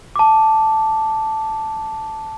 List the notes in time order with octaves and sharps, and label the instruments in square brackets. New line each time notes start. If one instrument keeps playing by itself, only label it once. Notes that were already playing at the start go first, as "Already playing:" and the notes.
[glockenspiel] A5 D6